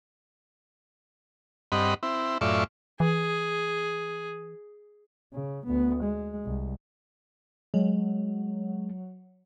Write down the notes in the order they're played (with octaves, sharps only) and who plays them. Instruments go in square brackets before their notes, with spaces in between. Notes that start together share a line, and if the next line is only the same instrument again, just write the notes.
[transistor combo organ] G2 C4 D#5 F#5 B5
C4 E4
F#2 A2 F4 D5 E5 C#6
[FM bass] E3 [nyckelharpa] G#4
[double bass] C#3
D2 B3
G#3
C2
[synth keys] F#3 [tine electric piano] G#3